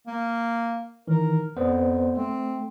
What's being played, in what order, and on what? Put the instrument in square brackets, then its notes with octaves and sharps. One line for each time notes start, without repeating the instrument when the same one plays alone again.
[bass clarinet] A#3
[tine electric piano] D#3 E3 [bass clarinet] A#4
[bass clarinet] F2 [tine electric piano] B3 C5 D5
[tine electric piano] A3 [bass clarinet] C4